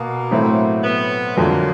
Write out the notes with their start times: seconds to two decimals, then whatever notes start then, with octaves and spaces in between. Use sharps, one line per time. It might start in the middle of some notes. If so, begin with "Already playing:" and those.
Already playing: B2 A#3
0.31 A2 F#3 A3 C4 E4
0.84 B3
1.37 F2 D3 F#3 A#3